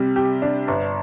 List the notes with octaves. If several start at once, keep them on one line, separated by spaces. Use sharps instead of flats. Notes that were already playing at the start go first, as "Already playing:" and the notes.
Already playing: C3 G3
G4
D4
G1